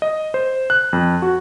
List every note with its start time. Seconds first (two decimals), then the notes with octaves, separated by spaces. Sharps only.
0.02 D#5
0.34 C5
0.70 F#6
0.93 F2
1.22 F#4